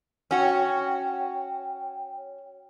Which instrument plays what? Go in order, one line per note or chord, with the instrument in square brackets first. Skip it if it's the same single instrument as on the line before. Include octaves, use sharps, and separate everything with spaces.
[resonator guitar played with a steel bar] C#4 F#4 [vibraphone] C#5 G5